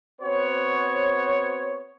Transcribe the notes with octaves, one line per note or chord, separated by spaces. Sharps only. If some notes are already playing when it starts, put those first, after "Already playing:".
B3 C4 F#4 C5 C#5